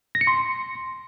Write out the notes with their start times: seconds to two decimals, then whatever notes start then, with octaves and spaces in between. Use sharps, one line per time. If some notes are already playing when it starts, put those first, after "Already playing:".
0.15 A#6
0.21 C#7
0.27 C6